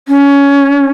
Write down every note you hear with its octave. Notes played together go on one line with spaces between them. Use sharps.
C#4